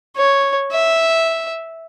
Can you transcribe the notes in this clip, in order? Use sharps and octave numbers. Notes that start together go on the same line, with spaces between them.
C#5
E5